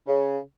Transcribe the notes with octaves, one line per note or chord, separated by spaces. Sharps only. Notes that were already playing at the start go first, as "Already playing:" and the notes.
C#3